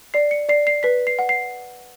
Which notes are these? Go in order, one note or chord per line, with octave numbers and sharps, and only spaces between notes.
D5 C7
C#7
D5 C7
C7
B4 B6
C7
F#5
C7